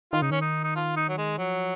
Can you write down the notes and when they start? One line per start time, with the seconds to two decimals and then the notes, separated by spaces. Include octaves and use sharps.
0.13 D#3 F4
0.22 C#3 D#4
0.31 D#3 C#4
0.42 D#4
0.64 D#4
0.76 F4
0.97 D#4
1.09 F#3
1.18 G#3
1.38 F3 F#3